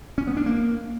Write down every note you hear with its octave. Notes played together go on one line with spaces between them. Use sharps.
C#4
B3
D4
A#3